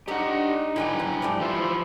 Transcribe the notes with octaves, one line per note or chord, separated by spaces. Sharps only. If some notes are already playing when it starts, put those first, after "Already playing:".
C4 D4 D#4 G4 F#5
D3 E3 F#3 E4 G5 G#5
G2 C#3 E3
F3 A3 D4 G4
E3 E4 F4 C5